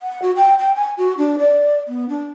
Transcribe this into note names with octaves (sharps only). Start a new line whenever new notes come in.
F#5
F#4
G5
G5
G#5
F#4
D4
D5
B3
D4